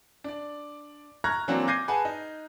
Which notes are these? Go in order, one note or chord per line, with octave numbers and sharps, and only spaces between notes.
D4 D5
A#5 C#6 F6 F#6 G#6 A#6
E3 F#3 A#3 C4 D4 F#4
D6 G6 G#6 A#6 C7 D#7
G#4 B4 F#5 G#5 A5
D#4